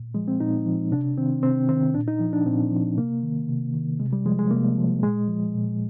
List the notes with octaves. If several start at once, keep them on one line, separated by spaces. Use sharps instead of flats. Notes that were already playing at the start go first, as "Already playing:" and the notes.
Already playing: A#2
F3 G#3
C4
A#2 D#4
F3
C3 D4
D#3 C4
C3 C4
D#3 C4
A#2 D4
D#4
F3
D4
A#2 C4
F3
C3 A#3
D#3
C3
D#3
C3 G#3
G3
F3 G#3
G#3
C3 A#3
F3
A#2 G#3
F3
A#2